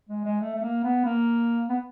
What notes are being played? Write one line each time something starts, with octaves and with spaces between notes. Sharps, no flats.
G#3
G#3
A3
A3
A#3
B3
A#3
B3